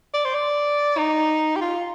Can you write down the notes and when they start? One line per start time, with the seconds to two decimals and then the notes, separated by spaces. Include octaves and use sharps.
0.14 D5
0.25 C5
0.34 D5
0.98 D#4
1.56 G4
1.61 F4